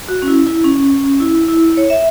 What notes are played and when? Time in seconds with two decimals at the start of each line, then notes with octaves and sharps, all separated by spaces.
0.08 F#4
0.22 C#4
0.28 E4
0.47 E4
0.64 C#4
1.20 E4
1.48 E4
1.77 C#5
1.90 E5